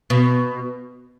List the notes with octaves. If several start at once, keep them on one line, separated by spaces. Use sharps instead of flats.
B2